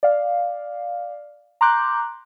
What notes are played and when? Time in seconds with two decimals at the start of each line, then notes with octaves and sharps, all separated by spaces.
0.03 D5 F5
1.61 A#5 C6 D6 F#6 G6